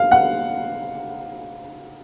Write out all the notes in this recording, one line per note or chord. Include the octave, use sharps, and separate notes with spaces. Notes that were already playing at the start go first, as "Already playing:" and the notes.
Already playing: F5
F#5